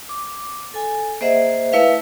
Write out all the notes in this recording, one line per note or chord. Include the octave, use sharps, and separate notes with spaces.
D6
A4 G#5
A#3 G#4 C5 D#5 E5 F#5
A3 E4 B4 E5 F5